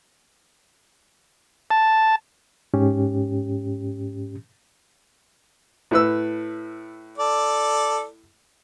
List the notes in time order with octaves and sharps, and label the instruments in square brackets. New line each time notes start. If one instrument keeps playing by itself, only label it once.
[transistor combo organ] A5
[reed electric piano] G#2 C#4 G4
[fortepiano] A2 B4 E6
[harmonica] A4 D5